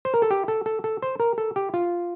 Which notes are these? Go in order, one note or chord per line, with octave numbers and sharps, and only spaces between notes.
C5
A#4
A4
G4
A4
A4
A4
C5
A#4
A4
G4
F4